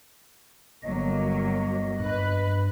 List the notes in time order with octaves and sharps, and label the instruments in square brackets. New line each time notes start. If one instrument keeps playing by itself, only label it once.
[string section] G1 F#3 A#3 [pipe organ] D#5
[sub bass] G2 [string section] B4 F#6